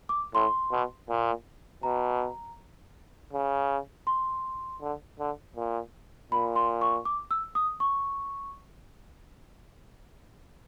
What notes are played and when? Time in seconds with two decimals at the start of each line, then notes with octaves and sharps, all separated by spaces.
0.09 D6
0.34 A2 C6
0.71 B2
1.09 A#2
1.83 B2 A#5
3.33 C#3
4.07 C6
4.81 D3
5.19 D3
5.56 A#2
6.32 A#2 B5
6.56 C6
6.81 C#6
7.05 D6
7.31 E6
7.55 D#6
7.80 C#6